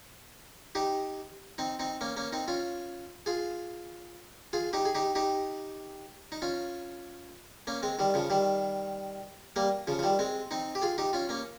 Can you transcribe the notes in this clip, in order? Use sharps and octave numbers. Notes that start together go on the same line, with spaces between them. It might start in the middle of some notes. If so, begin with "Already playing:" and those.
D#4 G4
C4 D#4
C4 D#4
A#3 C#4
A#3 C#4
C4 D#4
C#4 F4
F4 G#4
F4 G#4
D#4 G4
G#4
D#4 G4
D#4 G4
D#4
C#4 F4
A#3 C#4
G#3 C4
D#3 G3
C#3 F3
D#3 G3
G3 A#3
C#3 F3
F3
D#3 G3
G#3 C4
C4 D#4
G4
F4 G#4
D#4 G4
C#4 F4
A#3 C#4